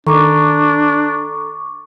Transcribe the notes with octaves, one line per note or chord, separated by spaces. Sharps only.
D#3 D4 A4 A#5 C#6 D6